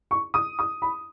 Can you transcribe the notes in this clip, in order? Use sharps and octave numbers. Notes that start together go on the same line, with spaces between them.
C#6
D#6
D#6
B5